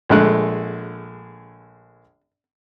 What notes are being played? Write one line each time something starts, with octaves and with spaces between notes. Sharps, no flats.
A#1 D3 G#3 A3 F#6